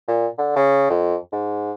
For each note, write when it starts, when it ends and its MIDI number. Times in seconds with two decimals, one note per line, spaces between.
0.08 0.27 46
0.38 0.52 50
0.56 0.89 49
0.90 1.16 41
1.32 1.72 44